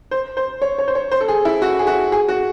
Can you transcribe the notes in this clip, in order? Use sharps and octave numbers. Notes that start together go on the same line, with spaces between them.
C5
C5
C#5
C#5
C5
C#5
C5
A4
G#4
E4
F#4
G#4
F#4
G#4
F#4